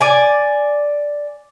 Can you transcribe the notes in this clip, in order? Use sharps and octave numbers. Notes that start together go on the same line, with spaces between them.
D5 G#5